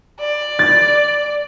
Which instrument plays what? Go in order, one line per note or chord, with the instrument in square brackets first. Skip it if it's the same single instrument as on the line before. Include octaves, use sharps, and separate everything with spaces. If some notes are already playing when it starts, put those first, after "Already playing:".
[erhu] D5
[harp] A6